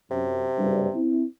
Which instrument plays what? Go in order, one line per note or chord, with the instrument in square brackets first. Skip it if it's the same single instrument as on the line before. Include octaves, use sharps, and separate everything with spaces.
[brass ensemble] F#2 [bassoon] C3
[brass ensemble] F#1 G2
C4 E4